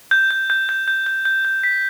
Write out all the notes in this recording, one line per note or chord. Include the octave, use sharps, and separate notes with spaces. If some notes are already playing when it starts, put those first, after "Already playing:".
G6
G6
G6
G6
G6
G6
G6
G6
B6